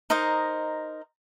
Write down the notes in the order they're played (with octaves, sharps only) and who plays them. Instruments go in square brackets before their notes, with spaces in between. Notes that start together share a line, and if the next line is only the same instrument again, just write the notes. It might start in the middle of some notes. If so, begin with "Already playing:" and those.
[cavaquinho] D#4 A#4 C5 D#5